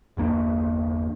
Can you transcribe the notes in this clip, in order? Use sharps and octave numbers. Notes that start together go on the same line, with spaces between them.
G1 E2 A#3 D4